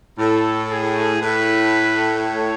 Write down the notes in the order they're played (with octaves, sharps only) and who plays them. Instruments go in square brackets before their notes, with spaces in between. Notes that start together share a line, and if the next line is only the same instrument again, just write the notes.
[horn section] A2 [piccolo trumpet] A4
[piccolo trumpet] G#4
[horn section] A2 [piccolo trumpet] B4
[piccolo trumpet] C#5